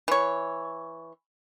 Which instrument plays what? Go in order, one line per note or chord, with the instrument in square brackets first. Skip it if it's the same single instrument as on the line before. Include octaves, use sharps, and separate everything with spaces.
[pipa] E3 C#5